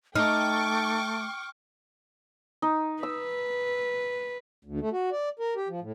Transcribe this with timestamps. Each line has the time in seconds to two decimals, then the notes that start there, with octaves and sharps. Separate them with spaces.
0.16 A3 D#4 G5 C#6 D6 F6
2.62 D#4
3.03 B4 E6
4.65 D2
4.81 A3
4.93 F#4
5.12 D5
5.39 A#4
5.56 G4
5.68 F3
5.81 A2